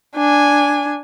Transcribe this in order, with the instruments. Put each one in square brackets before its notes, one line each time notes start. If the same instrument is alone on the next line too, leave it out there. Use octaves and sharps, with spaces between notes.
[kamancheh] D4 G#5